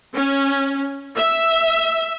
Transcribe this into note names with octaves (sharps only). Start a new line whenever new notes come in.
C#4
E5